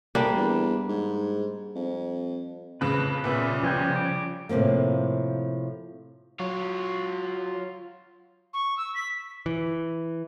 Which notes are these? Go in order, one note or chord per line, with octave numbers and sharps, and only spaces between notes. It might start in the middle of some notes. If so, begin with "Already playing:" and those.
D2 G3 A#3 D4
E2
G#2
F2
F2 A2 C#3 B4
A#2 C#3 G3 B3 E5
F3 G5 G#5
D6
A2 C3 E3 F3 A#3
F#3 F4 C#5
C#6
E6
B6
E3